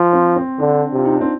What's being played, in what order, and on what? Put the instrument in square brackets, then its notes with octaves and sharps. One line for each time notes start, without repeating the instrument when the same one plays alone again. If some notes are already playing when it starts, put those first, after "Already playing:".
Already playing: [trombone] F3
[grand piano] C4
C4
[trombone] D3 [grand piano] D4
[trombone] C3 [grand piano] F4
[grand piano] D#4
D4
C4